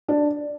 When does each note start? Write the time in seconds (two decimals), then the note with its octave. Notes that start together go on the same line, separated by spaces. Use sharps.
0.08 D4